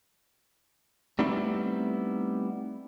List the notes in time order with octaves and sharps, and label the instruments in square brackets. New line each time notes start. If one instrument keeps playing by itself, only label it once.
[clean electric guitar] G3 A3 B3 C4 D#4 E4